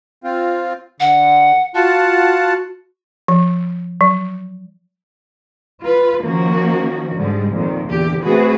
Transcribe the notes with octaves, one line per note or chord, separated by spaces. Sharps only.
C4 F4
D3 F#5
F4 F#4 F#5 A5
F3
F#3
F4 B4
D#3 F3 A#3 C#4 F#4
G#2 D3 G3 G#3
F2 A#2 D#3
E2 D3 G4
A3 C4 F#4 G#4 B4